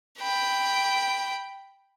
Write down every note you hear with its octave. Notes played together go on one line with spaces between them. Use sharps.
G5 B5